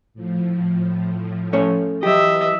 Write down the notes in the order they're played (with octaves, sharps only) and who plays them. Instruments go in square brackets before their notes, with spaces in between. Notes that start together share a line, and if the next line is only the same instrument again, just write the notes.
[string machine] A2 F3
[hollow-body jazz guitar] A3 C#4 C#5
[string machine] E3 B4 [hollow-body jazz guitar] F#3 G4 [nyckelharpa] D#5 E5